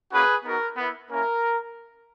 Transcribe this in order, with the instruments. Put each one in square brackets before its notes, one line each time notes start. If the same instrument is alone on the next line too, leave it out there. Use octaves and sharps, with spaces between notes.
[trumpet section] A#3 C#4 F#4 G#4 B4
B3 D#4 F#4 A#4
B3 E4
A#3 C#4 E4 A#4